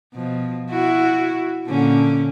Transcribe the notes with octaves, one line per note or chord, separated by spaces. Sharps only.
B2 F3
E4 F#4
A#2 D3 C#4